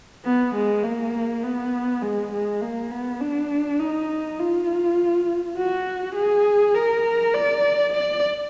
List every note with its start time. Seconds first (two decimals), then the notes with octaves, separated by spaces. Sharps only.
0.25 B3
0.55 G#3
0.84 A#3
1.43 B3
2.02 G#3
2.32 G#3
2.61 A#3
2.91 B3
3.21 D4
3.79 D#4
4.39 F4
5.57 F#4
6.15 G#4
6.75 A#4
7.34 D5
7.93 D5